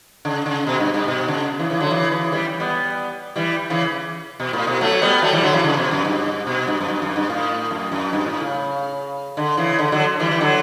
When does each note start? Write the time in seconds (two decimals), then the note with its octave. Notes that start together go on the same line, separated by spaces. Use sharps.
0.25 C#3
0.46 C#3
0.67 B2
0.80 G2
0.94 G2
1.08 B2
1.28 C#3
1.59 C#3 E3
1.70 C#3 E3
1.80 D3 F#3
1.90 C#3 E3
2.11 C#3 E3
2.32 E3 G3
2.60 G3 B3
3.36 E3 G3
3.70 C#3 E3
4.40 B2
4.53 A2
4.67 B2
4.81 F#3 A3
5.01 G3 B3
5.22 F#3 A3
5.33 E3 G3
5.43 D3 F#3
5.53 C#3 E3
5.64 C#3
5.77 B2
5.91 F#2
6.05 G2
6.47 B2
6.67 G2
6.81 F#2
6.88 G2
7.02 F#2
7.16 G2
7.30 A2
7.71 F#2
7.92 F#2
8.13 G2
8.26 A2
8.40 C#3
9.37 D3
9.57 C#3 E3
9.79 D3
9.92 D3 F#3
10.20 E3 G3
10.31 E3
10.41 D3 F#3